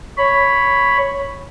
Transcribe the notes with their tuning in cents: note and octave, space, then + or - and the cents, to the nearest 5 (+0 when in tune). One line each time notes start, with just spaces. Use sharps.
C#5 +0 B5 +0